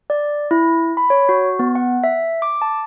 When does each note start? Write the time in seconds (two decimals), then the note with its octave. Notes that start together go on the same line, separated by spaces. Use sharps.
0.10 D5
0.51 E4
0.97 B5
1.10 C#5
1.29 F#4
1.59 B3
1.75 F#5
2.04 E5
2.42 D6
2.62 A5